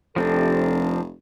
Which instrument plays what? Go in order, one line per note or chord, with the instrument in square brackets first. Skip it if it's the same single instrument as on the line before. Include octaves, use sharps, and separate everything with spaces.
[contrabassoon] F1 [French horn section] C3 A4 [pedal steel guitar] F3 C4 D4